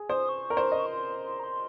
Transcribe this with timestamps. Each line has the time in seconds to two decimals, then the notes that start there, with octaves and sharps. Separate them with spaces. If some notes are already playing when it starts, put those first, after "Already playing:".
Already playing: G#4
0.09 C5 D#6
0.29 C#6
0.50 A#4
0.57 C5
0.72 D#5
0.78 C#6
0.86 C6
1.40 A#5
1.44 C6